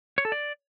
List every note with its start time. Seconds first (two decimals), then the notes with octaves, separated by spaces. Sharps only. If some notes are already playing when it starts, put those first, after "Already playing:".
0.18 C#5
0.25 A4
0.32 D5